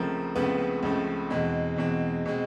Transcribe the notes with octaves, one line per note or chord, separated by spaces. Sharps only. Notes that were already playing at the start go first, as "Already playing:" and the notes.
Already playing: C#2 C#3 F3 A3 C4 A#4
C#2 C#3 F3 A3 B3 C4 B4
C#2 C#3 F3 A3 C4
E2 B2 G#3 C4
E2 B2 G#3 C4
B2 G#3 C4